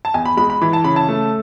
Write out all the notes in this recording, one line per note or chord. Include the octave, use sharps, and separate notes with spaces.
A5
E2 G#5
B5
G#3 B5
B5
E3 B5
A5
C#3 B5
A5
A3